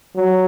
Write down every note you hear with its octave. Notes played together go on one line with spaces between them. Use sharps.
F#3